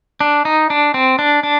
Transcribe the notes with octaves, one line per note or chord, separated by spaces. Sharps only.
D4
D#4
D4
C4
D4
D4